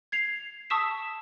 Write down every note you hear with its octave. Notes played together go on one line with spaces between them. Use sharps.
G#6 C7 F7
A5 C#6 D#6 E6 B6 E7